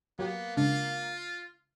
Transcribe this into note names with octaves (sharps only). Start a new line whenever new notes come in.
F#3 A#3 B3 G4
C#3 G#3 D4 F4